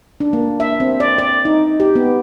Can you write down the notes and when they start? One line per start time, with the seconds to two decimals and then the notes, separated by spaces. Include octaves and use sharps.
0.20 D4
0.33 A#3
0.60 E5
0.80 C4
1.00 D5
1.18 D5
1.45 D#4
1.80 G4
1.96 B3